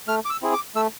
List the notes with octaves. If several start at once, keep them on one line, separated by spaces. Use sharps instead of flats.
A3 F6
D6
E6
C4 E4 G#4
D6
A3 E6